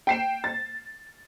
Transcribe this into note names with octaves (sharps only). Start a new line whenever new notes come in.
G5 C7 E7
A6